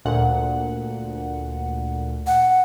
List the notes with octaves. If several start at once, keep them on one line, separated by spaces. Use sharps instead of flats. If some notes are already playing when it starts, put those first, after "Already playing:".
D2 A#2 F#5
F#5